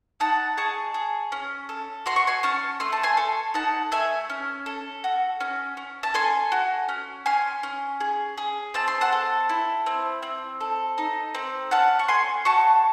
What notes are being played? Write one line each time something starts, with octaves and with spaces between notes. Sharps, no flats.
D#4 F#5 A5
G#4 A5 C#6
G#4
C#4
A4
F#4 C6
C#6
G#5 C6
C#4 A5 C#6
A3 C6
A5
G#5 C6
A4
D#4 F#5 A5
A3 E5 G#5
C#4
A4
F#4
C#4
C#4
A5
A4 G#5 C6
F#4
C#4
C#4 G#5 C6
C#4
G#4
G#4
C4 A5
C6
F#5 A5
A4
E4
C4
C4
A4
D#4
C4
C#4 F#5 A5
C#6
A4 G#5 C6
F#4 A5 C#6